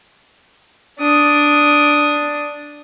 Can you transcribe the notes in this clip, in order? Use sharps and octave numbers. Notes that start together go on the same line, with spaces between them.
D4 D#6